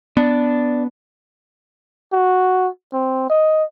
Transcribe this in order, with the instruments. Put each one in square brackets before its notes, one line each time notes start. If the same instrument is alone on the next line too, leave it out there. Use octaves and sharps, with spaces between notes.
[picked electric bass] B3 [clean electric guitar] D4
[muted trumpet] F#4
C4
D#5